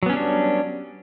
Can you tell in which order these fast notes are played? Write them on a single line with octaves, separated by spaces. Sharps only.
F#3 B3 C#4 G3 D4